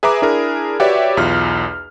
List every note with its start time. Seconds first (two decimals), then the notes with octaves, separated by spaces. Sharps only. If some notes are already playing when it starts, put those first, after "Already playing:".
0.03 G#4 B4 E5 G#5 A#5 D6
0.22 D4 E4 G#4 A#4
0.80 F#4 G4 B4 C#5 D5 E5
1.17 B1 E2 F4 F6